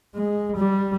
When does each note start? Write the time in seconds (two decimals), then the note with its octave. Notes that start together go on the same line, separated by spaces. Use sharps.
0.15 G#3
0.57 G3